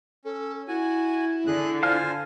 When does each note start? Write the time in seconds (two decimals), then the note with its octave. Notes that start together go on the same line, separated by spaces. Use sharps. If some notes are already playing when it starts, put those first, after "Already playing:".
0.25 C#4 A4
0.68 E4 F#4 G#5
1.47 D3 G#4 F#6
1.83 F4 C5 F5 G#5 A5 F6